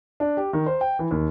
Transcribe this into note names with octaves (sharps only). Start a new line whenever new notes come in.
D4
G4
D#3
C5
G5
E3
D#2